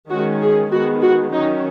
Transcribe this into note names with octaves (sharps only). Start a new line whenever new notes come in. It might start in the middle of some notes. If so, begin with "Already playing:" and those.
D#3 G#3 C#4 F#4
G#4
D#3 G#3 B3 F#4
F#4
D#3 F#3 C#4 D#4